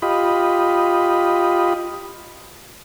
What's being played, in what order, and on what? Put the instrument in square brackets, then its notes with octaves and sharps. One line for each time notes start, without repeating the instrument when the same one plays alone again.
[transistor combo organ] F4 G4 D#5 B5